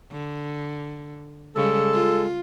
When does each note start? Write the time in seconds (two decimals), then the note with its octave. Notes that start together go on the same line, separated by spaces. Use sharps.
0.12 D3
1.56 C#3 G3 G#3 A4
1.93 F4